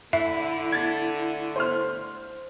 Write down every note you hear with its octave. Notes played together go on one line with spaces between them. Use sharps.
D3 A3 E4 E5
G#6 A6
C5 C6 F6